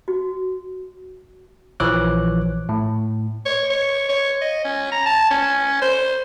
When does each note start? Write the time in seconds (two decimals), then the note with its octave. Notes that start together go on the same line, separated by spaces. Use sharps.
0.08 F#4
1.80 A#1 E3 F3 C#5 D6 F#6
2.69 A2
3.45 C#5
3.70 C#5
4.09 C#5
4.41 D#5
4.65 C#4
4.92 A#5
5.06 A5
5.31 C#4
5.82 C5